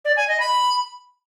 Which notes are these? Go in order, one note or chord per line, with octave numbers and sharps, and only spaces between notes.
D5
G#5
D#5
B5